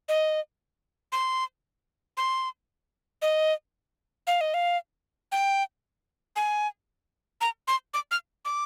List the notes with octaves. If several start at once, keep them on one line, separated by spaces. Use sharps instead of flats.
D#5
C6
C6
D#5
F5
D#5
F5
G5
G#5
A#5
C6
D6
F6
D6